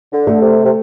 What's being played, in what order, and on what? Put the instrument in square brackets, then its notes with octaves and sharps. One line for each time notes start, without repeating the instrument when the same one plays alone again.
[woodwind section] D3
[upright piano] A3
[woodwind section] C3
C3